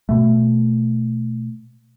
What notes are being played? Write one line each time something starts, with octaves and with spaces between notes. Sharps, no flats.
B2 A3